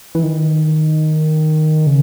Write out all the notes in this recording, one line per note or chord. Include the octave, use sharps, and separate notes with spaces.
E3
D#3
C#3